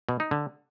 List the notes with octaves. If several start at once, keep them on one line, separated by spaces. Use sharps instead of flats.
B2
D#4
D3